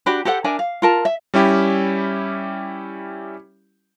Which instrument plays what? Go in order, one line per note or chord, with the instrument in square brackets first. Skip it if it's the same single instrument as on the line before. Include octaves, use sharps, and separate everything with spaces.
[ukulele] D4 F#4 G4 B5
G4 A4 C5 F#5
D4 A#4 E5 G#5
F5
F4 A#4 A5
E5
[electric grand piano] G3 C#4 E4 G4